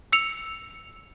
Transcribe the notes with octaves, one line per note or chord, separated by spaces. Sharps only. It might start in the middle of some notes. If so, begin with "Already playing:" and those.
E6 C#7 F7